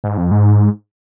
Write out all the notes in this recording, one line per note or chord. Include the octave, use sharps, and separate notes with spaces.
G#2
F2
G#2